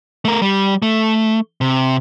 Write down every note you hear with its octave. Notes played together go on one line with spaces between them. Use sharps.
A3 A#4
G3
A3
C3